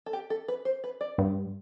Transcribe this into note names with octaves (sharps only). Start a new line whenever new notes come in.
A4
G4
A4
B4
C5
B4
D5
G2